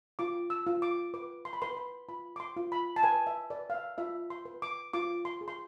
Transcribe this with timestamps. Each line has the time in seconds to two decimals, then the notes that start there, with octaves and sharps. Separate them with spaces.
0.19 F4 D6
0.50 E6
0.66 F4
0.82 D6
1.14 B4 D6
1.45 C6
1.53 B5
1.62 B4 C6
1.77 B5
2.09 F4 B5
2.36 D6
2.40 C6
2.57 F4
2.72 B5
2.96 A5
3.03 B4 G#5
3.27 E5
3.50 B4 D5
3.70 F5
3.74 E5
3.98 F4 E5
4.30 C6
4.45 B4
4.62 D6
4.93 F4 D6
5.25 C6
5.41 G#4
5.48 C6